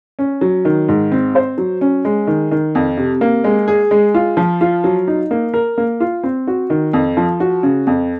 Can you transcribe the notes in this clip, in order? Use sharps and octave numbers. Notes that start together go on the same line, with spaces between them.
C#4
F#3
D#3
G#2
C4
C5
F#3
C#4
G#3
D#3
D#3
F2
C3
A#3
G#3
G#4
G#3
F4
F3
F4
F#3
D#4
A#3
A#4
A#3
F4
C4
F#4
D#3
F2
F3
F#4
C#3
F2